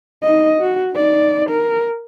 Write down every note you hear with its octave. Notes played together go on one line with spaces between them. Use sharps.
D#4 D#5
F#4
D#4 D5
A#4